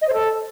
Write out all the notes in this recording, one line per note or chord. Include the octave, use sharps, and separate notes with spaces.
D#5
C5
A4